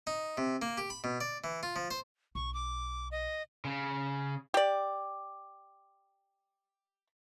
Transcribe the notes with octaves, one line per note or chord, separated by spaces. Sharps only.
D#4
C3
A#3
G4
B5
B2
D5
E3
F4
F3
C5
B1 C#6
D6
D#5
C#3
G4 D5